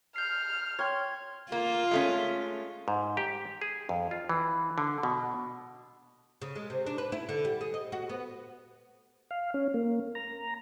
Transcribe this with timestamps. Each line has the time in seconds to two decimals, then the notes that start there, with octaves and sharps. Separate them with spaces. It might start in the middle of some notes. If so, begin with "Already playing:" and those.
0.16 F6 G6 C7
0.79 C#5 G5 C6 G#6
1.52 A#3 F4
1.91 G#3 A3 C#4
2.88 G#2
3.17 G4
3.61 G#4
3.89 F2
4.11 F4
4.29 E3
4.78 D3
5.03 B2
6.42 C#3
6.55 G#3
6.70 C3
6.87 D4
6.98 B4
7.12 E4
7.29 D3
7.45 G3
7.61 G#4
7.74 D#5
7.92 F#4
8.10 B3
9.31 F5
9.54 C#4
9.74 A#3
10.15 A#5